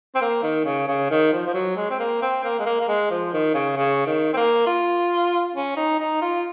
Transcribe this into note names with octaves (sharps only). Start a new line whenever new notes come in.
C4
A#3
D#3
C#3
C#3
D#3
F3
F3
F#3
G#3
C4
A#3
C4
A#3
G#3
A#3
A#3
G#3
F3
D#3
C#3
C#3
D#3
C4
A#3
F4
C#4
D#4
D#4
F4